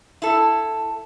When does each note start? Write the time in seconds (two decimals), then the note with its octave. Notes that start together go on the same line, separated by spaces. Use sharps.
0.22 E4 A4